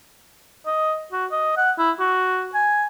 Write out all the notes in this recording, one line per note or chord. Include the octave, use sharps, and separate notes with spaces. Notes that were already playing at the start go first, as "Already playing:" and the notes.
D#5
F#4
D#5
F#5
E4
F#4
G#5